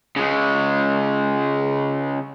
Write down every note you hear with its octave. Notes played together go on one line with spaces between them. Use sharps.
C#3 G#3